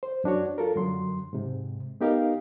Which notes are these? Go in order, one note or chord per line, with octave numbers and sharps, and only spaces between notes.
C5
F#2 D4 F#4 C#5
F4 A4 A#4
F#2 D3 F#3 C6
G#2 C3
B3 D#4 G4 A#4 D#5 F5